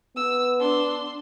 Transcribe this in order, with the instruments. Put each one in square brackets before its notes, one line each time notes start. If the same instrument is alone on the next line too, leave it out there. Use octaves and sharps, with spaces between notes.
[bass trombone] B3 [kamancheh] E6
[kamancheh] D4 C6